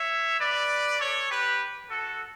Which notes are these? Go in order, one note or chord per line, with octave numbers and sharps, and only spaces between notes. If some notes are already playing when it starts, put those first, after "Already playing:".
Already playing: C#5 E5
B4 D5
A4 C#5
G4 B4
F#4 A4